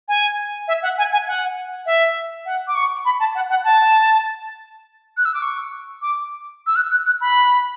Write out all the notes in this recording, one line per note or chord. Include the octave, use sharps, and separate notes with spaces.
G#5
E5
F#5
G#5
G#5
F#5
E5
F#5
D6
C#6
B5
A5
F#5
F#5
A5
F#6
E6
D6
C#6
D6
E6
F#6
F#6
F#6
B5